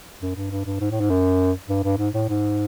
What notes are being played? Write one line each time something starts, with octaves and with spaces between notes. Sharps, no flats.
F#2
G2
G2
G2
G#2
A2
G#2
F#2
G2
G2
G#2
A2
G#2